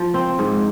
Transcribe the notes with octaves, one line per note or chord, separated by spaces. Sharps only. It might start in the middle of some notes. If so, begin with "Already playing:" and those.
Already playing: F3
C4
G#2